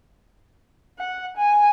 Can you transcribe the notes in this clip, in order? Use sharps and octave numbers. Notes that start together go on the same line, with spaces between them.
F#5
G#5